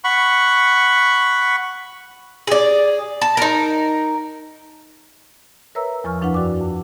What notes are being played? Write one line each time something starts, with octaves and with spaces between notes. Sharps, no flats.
F#5 B5 C#6
G#4 D5
A5
D#4 A#4
A#4 B4 C#5 E5 A#5 E6
E2 F3 G#5 C#6 F6
F#2 F3 D4 E4 B4 F#5
F#4 D5 G5 D6
F2